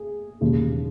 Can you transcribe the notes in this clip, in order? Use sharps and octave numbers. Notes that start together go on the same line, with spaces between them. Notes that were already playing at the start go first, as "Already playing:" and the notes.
Already playing: G#4
E1 D#2 C#3